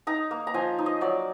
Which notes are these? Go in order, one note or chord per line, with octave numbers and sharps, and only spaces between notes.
D#4 A#5
A#3
A#5
F3 G#5
D#4
D#5
F#3 D5